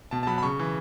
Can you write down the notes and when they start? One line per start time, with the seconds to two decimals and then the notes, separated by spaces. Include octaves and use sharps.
0.11 B2 A5
0.23 A5
0.27 F#3 B5
0.38 B5
0.43 C#3 C#6
0.60 E3